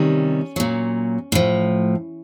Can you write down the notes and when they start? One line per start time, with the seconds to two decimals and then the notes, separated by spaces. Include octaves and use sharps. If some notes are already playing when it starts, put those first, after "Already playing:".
Already playing: C3 D#3 G3 C#4
0.56 A#2 F#3
1.32 A2 F3